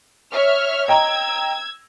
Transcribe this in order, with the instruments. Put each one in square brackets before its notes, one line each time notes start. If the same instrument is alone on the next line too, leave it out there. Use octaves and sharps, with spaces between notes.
[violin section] C#5 E5 F6
[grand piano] D#5 G5 A#5 [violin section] E6 G#6